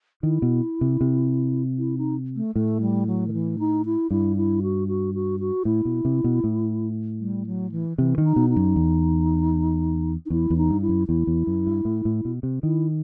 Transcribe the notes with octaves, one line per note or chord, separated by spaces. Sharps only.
D#3 E4
B2
C3
C3
E4
D#4
A3
A2 A3
G3
F#3
D#3
E3
D#4
E4
G2 E4
E4
F#4
F#4
F#4
F#4
A2 E4
B2
C3
B2
A2
G3
F#3
E3
C3 E3
D#3
D#4
B2
D#4
F#2
E2
D#4
E2 E4
E2
D#4
G2
E4
F#2
E2 E4
E2
F#2
G2
A2
A2
B2
C3
D#3 E4